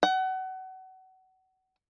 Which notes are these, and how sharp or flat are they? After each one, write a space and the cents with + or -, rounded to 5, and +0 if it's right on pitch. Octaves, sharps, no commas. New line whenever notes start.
F#5 +30